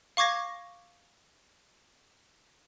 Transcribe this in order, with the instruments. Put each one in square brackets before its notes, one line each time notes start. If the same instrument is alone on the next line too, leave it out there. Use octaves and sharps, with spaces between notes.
[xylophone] F5 C#6 D6 G#6 A#6